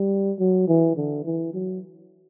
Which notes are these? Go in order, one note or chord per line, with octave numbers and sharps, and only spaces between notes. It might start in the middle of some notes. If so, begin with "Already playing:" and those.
Already playing: G3
F#3
E3
D3
E3
F#3